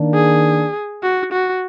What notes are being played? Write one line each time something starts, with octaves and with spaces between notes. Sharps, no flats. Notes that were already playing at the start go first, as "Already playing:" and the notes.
Already playing: D#3 A#3 D4
G#4
F#4
F#4